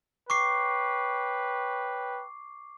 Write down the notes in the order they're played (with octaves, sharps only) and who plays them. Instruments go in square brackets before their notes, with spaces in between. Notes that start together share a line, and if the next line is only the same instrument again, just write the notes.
[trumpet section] B4 C#5 G5 [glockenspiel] C#6 D6 C7